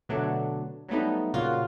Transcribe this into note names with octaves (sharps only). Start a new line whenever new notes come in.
B2 D3 F#3 A3 D4
F#3 G3 A3 B3 D#4
A#2 C#3 F4 F#4